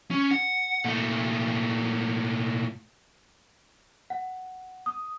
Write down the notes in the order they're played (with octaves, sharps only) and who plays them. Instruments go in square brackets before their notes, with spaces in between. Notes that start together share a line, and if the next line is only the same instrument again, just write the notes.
[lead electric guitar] C#4
F#5
A#2 A3
[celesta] F#5
D#6